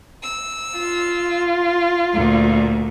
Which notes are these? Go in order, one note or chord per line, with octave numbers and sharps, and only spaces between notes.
E6
F4
D2 A#2